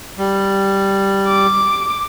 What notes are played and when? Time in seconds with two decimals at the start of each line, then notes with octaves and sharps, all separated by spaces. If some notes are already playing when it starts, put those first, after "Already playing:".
0.18 G3
1.28 D6